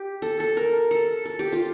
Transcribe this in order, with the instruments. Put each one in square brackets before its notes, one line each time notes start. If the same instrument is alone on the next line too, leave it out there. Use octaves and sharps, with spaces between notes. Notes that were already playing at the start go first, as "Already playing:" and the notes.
Already playing: [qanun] G4
A4
A4
A#4
A4
A4
G4
F4